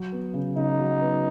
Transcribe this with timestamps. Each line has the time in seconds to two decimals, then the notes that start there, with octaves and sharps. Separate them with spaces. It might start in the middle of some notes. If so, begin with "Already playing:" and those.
Already playing: F#3
0.12 B3
0.34 C#3
0.56 C#3 D#4
0.79 F#3
1.01 B3